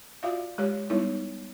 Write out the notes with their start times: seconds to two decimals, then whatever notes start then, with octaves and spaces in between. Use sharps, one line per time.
0.23 F4 F#4 D5 E5 F5
0.58 G#3 G4 C#5
0.90 G3 B3 D#4 E4 C#5